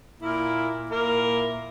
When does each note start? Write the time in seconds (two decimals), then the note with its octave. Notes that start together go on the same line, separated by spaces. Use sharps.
0.19 A#2 A#3 E4 A#4
0.89 A#2 A#3 E4 A#4